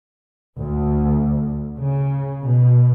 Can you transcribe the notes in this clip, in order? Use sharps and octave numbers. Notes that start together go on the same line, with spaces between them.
D2
C#3
B2